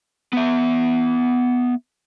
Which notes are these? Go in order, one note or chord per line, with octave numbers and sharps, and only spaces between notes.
B3 E5